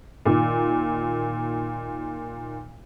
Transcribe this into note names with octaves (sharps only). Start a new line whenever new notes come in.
A#2 D#3